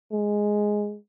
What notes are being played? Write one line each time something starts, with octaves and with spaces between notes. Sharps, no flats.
G#3